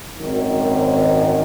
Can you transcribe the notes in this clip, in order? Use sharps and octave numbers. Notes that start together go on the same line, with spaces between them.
G#1 F#2 D#3